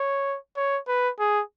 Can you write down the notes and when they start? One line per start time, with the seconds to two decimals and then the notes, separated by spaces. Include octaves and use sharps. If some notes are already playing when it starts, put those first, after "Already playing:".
Already playing: C#5
0.56 C#5
0.88 B4
1.19 G#4